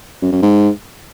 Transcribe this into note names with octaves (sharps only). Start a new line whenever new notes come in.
F#2
F#2
G#2